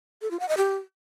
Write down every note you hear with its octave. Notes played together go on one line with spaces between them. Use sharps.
A4
F4
F#5
D#5
G4